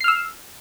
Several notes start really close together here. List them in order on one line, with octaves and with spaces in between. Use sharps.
C7 F6 E6